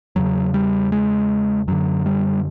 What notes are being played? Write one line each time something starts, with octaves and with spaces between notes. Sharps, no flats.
E2 C#3 F#3
G3
G#3
F#2 D3 F#3
G3